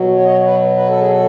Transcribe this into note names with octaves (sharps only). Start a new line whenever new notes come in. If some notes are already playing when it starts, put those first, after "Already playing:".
Already playing: B2 F#3
C#5
D#5
C#5
B4
B4
A4
G#4
A4